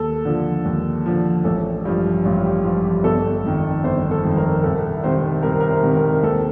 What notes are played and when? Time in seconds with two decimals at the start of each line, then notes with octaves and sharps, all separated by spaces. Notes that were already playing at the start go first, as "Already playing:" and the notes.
Already playing: D#2 A4
0.25 D3 F3
0.65 D#2
1.06 D3 F3
1.44 A1 A4
1.85 G2 F3
2.25 A1 F4
2.44 G4
2.64 G2 F3 F4
2.84 G4
3.04 G1 A4
3.44 F2 D#3
3.84 G1 C5
4.11 A4
4.24 F2 D#3
4.37 A#4
4.63 C2 A4
5.03 C3 D#3 C5
5.43 C2 A#4
5.60 A#4
5.70 C5
5.83 C3 D#3
5.96 A#4
6.23 D#2 A4